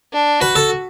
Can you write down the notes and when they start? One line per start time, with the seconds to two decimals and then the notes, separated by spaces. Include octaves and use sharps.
0.13 D4
0.41 F#4 B4
0.56 A4